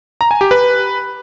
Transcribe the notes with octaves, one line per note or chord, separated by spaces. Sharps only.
A#5
G#5
G4
B4